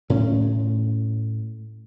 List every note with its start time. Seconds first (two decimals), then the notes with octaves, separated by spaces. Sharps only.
0.10 A2 C#4